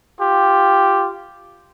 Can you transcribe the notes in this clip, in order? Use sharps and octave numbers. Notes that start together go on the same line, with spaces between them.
F4 G4